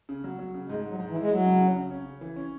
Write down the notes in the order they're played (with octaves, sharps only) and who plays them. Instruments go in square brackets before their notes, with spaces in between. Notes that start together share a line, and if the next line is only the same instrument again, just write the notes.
[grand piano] C#3
F#3
F#3
C#3
[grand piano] G#2 [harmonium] G#3
[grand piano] G#2 [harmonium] F#3
[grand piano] G#2
[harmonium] E3
[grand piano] E4
[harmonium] G#3
[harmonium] F#3 [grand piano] E4
[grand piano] C#3
C#3
C#3
C#4
C#3
E3
C#4